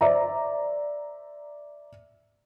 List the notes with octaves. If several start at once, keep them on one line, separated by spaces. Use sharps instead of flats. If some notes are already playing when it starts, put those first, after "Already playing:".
C5 D5 E5 A#5